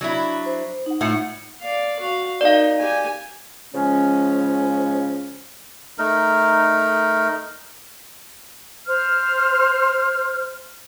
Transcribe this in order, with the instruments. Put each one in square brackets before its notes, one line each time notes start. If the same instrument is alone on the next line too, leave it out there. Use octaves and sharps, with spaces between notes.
[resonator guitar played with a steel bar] F#3 D4 E4
[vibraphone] C5
D#4 F#5
[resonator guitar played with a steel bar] A2 F4 F#5 [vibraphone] A3
[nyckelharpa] D5 F5
F#4 F5
[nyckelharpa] D#4 A#4 [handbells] D5 F5
[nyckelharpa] G4 G#5
[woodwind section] C#3 F3 G#3 C#4
[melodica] A3 D#4 A#4
[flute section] C5 F6